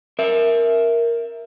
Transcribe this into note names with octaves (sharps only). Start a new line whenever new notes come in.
A#4 E5